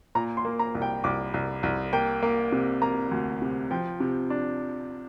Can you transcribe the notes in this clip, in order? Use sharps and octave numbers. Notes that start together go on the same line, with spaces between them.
A#2 A#5
C6
A#3
A#5
C2
G5
C2 D6
C2
C2
A#3 G5
A#3
C3
A#3 A#5
D2
C3
F3 G5
C3
D4